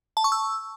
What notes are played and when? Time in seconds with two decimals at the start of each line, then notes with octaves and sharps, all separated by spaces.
0.17 A5
0.24 C#6
0.32 E6